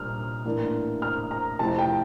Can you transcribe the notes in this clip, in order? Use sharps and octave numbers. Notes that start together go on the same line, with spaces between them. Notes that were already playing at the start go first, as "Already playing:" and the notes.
Already playing: A#2 G3 D4 F6
A2 E3 A#3 D4
F6
A#5
F2 C3 F3 A3 E4 A5
G5